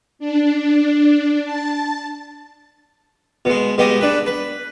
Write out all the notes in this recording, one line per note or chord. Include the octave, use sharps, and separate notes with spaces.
D4
A5
B2 G#3
B2 G#3 G4 D#5
D4 B4
B4